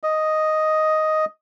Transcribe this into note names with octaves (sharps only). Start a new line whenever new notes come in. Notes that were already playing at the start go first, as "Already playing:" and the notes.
D#5